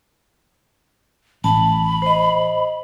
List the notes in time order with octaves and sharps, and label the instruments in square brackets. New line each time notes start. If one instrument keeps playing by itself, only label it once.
[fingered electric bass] A1 [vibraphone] A5 [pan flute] B5
[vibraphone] C5 D#5